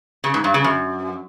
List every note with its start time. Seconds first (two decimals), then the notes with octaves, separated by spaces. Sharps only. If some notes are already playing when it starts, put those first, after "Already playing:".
0.24 C#3
0.34 G#2
0.44 G2
0.54 C#3
0.64 F#2